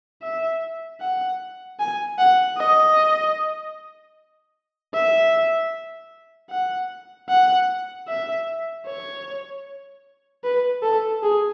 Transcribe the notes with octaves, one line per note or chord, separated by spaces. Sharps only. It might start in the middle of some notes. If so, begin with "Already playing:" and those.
E5
F#5
G#5
F#5
D#5
E5
F#5
F#5
E5
C#5
B4
A4
G#4